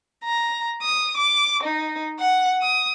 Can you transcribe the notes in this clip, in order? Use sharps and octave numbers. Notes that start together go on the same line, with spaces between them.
A#5
D#6
D6
D#4
F#5
D#6